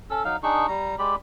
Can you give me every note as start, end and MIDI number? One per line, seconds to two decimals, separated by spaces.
0.10 0.23 61
0.10 0.23 69
0.10 0.23 88
0.25 0.37 54
0.25 0.37 63
0.25 0.37 77
0.43 0.67 62
0.43 0.67 63
0.43 0.67 68
0.43 0.67 85
0.68 0.95 55
0.68 0.95 82
0.99 1.16 56
0.99 1.16 67
0.99 1.16 74
0.99 1.16 83